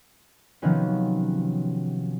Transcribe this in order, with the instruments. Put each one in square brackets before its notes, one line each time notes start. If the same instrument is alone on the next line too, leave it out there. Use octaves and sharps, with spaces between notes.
[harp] C3 D#3 F3 F#3 B3 C#4